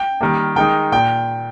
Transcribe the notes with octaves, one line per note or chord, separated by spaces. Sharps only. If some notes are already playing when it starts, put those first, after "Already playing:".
Already playing: G5
D#3 G3 A#3
D#3 G#3 D#4 G5
A#2 G5